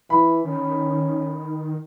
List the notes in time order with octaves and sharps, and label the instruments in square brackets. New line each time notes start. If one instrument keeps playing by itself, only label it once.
[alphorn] E3 [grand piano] B5
[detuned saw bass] D#3 [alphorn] C#4